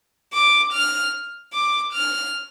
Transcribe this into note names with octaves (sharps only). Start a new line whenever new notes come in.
D6
F6
D6
F6